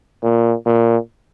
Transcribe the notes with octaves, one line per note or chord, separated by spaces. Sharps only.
A#2
A#2